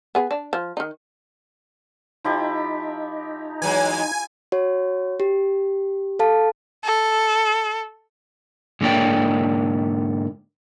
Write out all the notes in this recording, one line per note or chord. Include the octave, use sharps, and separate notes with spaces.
B3 G#4
D4
F3
D#3 D#4
F3 D#4 E4 G4
E3 F#3 G#3 G#5
F#4 C#5
G4
A4 F5 A5
A4
G#2 D3 A#3 C#5 D5 G5